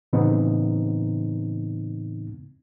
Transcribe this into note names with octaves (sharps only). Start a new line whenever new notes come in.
A2 C#3 E3 B3 C4 D#4